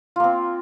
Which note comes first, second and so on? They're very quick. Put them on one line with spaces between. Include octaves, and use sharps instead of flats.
F4 A#3 C4